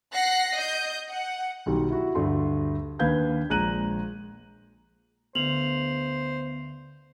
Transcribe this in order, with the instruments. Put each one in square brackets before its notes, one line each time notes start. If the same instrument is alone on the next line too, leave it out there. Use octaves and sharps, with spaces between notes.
[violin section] F#5 F#6 A#6 C7
D#5 G6
F#5
[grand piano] B1 D#3 G3
E4 F#4
D2 G2 A3 C6
D#2 D4 B4 F5 G6 G#6
A#1 G#3 A#5 F#6 D#7 F#7
[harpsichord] D2 [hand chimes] B3 [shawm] C5 [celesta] F7 F#7